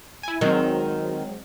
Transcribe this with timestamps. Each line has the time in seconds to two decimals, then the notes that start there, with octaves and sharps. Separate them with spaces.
0.23 E4 G#5
0.41 D#3 F#3 G#3 C4